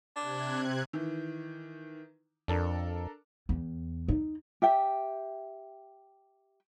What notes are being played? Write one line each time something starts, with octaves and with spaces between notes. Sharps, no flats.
C3 D4 F#6 G#6
D#3 E3
F2 D4 A4 A#4
E2
D#4
G4 E5 G5